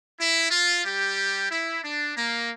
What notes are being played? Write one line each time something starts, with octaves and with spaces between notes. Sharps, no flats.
E4
F4
G3 G4
E4
D4
A#3